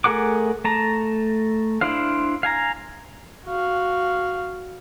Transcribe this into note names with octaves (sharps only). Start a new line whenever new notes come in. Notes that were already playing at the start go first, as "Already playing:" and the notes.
A3 G#4 A#4 F#5 D6
A3 A5 A#5
D4 E4 C5 F5
F5 G#5 A#5
F#4 F5